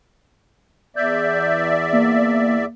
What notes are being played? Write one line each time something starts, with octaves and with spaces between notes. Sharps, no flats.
E2 D5 E5 G6
A#3